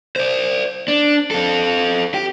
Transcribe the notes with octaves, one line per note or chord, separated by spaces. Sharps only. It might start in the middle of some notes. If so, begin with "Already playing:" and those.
C5 D5
D4
C4 A4
G4